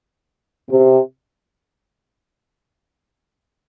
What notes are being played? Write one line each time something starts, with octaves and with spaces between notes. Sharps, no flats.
C3